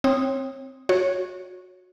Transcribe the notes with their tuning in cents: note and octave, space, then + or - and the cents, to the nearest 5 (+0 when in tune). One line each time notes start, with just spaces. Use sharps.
C4 +0 C#5 -30 D#6 +0
F#4 -20 C#5 +0